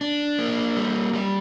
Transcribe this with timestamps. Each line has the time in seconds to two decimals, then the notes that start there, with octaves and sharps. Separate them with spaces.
0.01 D4
0.38 A#3
0.77 G3
1.13 G3